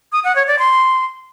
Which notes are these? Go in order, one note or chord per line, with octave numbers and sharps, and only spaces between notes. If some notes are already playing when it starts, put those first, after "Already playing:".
D#6
F#5
C#5
D5
C6